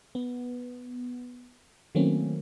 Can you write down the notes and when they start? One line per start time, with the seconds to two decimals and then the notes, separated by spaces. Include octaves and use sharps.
0.15 B3
1.95 D#3 F#3 A3 A#3 C4 C#4